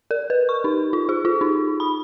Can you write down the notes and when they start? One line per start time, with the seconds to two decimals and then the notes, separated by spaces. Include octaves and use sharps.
0.11 A#4
0.30 B4
0.49 C#6
0.64 D#4
0.93 F4
1.09 G#4
1.25 F4
1.41 D#4
1.80 B5